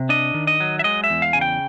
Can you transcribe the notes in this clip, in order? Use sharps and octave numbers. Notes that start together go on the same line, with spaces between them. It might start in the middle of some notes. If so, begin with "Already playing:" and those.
Already playing: C3
D4 D#5
D#3
D#5
F#3
E5
G#3 D#5
E5
E2
F5
C#3 G#5
G5